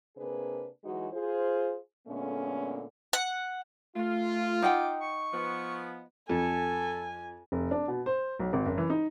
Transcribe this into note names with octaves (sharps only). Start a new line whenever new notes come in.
C3 A#3 D4 G#4 B4
E3 F#3 G#3 D#4 F#4
F4 G#4 C5
A#2 D3 G#3 A3 B3 C#4
F#5
A3 F4
D#4 F#5 G5 D6
C#6
F3 B3
F2 A4 G#5
F1
D4
B2
C5
B1
G#1
F#1
E3
D#4